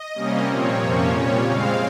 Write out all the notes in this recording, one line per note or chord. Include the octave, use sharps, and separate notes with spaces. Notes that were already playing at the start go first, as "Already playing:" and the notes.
Already playing: D#5
C3 G3 A#3 C#4
A#2 F3 C4 C#5
F2 C3 F3 A#3 C#4
A#2 G3 C#4 C#5
C#3 G#3 C4 F5